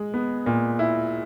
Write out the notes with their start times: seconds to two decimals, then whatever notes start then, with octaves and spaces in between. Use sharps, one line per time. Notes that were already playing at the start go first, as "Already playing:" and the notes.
Already playing: G#3
0.14 B3
0.46 A#2
0.79 E4